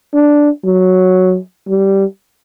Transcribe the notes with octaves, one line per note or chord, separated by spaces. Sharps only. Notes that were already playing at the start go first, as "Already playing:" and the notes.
D4
F#3
G3